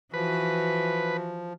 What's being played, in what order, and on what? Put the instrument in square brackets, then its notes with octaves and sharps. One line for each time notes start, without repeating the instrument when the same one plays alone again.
[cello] E3 F#4 [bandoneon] F3 [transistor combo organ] B4